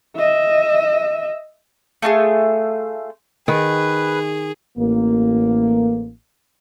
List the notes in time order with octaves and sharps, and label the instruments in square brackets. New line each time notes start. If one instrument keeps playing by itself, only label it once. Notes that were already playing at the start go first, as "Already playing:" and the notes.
[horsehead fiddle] D#5 E5
[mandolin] A3 F4 F#4 G#4
[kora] D#3 [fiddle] G#4 [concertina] B4
[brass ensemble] A1 A#3